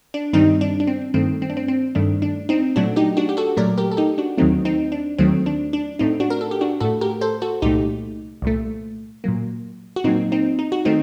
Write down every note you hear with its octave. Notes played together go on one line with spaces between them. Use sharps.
D4
G2 D#3 G3 C4 D#4
D4
D4
C4
G2 D#3 A3 C4
C4
D4
C4
C4
G2 D#3 A3 D4
D4
C4 D#4
A#2 F#3 A3 D4 F#4
D#4 G4
D4 F#4
G4
F#4 A4
A#2 F#3 A3 A#4 D5
G4 A#4
A4
D#4 G4
D4 F#4
D#2 D#3 F#3 A3 C4 D#4
C4 D#4
D4
D#2 D#3 F#3 A3 C4
D4
D4
A2 A3 C4 D#4
D4 F#4
A#4
A4
G4
D4 F#4
A2 A3 F#4 A4
G4 A#4
A4 C5
F#4 A4
C2 A#2 A3 D#4 G4
C2 A#2 A3
A#2 F#3 A#3
F#4
A#2 F#3 A#3 C4 D#4
C4 D#4
D#4
F#4
D#3 A3 C4 D#4